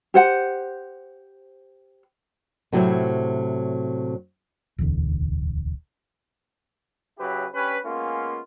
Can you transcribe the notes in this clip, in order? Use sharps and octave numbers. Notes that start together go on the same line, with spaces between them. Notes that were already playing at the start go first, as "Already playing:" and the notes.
G4 C5 F#5
A2 C3 F#3 E4 C5 C#5
D1 B1 E2 D3
C#3 F#3 E4 G4 B4
G2 C#4 G4 B4
G#3 A#3 B3 C#4 F4